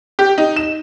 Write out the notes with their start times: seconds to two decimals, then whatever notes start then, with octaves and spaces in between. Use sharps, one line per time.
0.19 G4
0.38 D#4
0.56 E7